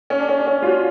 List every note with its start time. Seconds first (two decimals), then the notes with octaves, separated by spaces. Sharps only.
0.10 C#4
0.19 D4
0.29 C#4
0.38 D4
0.47 C#4
0.62 F4
0.67 F#4